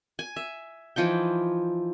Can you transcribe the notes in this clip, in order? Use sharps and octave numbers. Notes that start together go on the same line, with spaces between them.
G#5
E5
E3 F3 D#4 G5